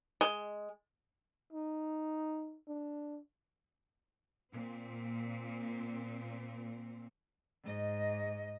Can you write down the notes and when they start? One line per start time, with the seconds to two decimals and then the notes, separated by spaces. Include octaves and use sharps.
0.21 G#3
1.53 D#4
2.68 D4
4.52 A#2 C4
7.63 G#2 D#5